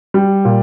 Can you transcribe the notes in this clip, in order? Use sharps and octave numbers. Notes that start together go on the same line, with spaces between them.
G3
A#2